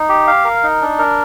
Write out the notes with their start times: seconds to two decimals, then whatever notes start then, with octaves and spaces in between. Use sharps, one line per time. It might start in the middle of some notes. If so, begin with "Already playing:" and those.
Already playing: D#4
0.09 G4
0.27 F5
0.45 A#4
0.63 D#4
0.82 D4
0.99 A#4